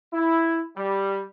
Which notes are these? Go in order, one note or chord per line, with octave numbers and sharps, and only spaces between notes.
E4
G3